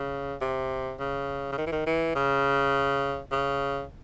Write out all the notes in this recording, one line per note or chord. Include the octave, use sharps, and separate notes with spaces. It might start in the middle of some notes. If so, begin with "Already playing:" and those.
Already playing: C#3
C3
C#3
C#3
D#3
E3
D#3
E3
C#3
C#3